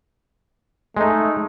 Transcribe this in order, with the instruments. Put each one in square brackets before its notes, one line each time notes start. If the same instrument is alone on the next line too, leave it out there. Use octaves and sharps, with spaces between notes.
[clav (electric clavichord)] G#3 D#4 [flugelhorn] A3